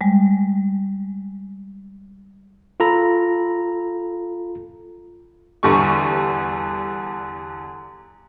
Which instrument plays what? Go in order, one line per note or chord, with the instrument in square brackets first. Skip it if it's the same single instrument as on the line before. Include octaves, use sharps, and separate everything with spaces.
[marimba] G3 G#3
[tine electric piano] F4 A4 A#5 B5
[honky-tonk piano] E2 D3 G3 C#6